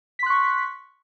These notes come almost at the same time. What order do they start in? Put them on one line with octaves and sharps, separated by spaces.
B6 C6 F#6 C#6